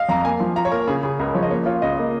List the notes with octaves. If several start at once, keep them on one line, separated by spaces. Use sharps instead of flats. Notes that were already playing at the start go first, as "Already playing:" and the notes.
Already playing: D#5 F5
F2 A#5
A#3 G#5
F3
F4 A#5
C#5
A#3 A#4
C#3 G#4
C#3 G#4
C#2 A#4
F3 C#5
D#5
A#3 C#5
F4 C#5
C#2 D#5
A#3